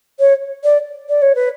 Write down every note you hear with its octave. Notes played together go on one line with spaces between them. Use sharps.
C#5
D5
D5
C#5
B4